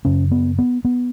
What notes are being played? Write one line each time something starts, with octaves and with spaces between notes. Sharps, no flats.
F#2 C#3 C#4
B3
B3
B3